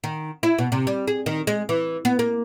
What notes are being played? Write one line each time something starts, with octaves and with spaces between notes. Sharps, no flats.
D#3
E4
B2
C3
G3
G#4
D#3
G#3
E3
B3
A#3